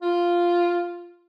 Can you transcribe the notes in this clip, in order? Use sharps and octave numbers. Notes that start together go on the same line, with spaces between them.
F4